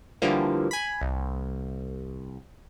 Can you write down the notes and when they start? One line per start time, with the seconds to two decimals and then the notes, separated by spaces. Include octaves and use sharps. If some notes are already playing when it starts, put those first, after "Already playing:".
0.22 D3 E3 F3 G3 A#3
0.71 G#5 B5
1.01 C2